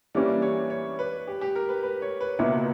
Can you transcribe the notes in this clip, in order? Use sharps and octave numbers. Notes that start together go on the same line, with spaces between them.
E3 G3 A#3 C#4 D4 G4
C#5
C#5
B4
G4
G4
A#4
B4
B4
C#5
B4
C#2 B2 A#3 E4